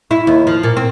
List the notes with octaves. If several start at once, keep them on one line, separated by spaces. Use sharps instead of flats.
E4
D#2
F3
A#2
C4